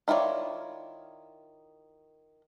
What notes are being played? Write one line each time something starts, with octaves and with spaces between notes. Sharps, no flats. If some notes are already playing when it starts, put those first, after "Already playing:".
D#3 E4 F4 C#5 D5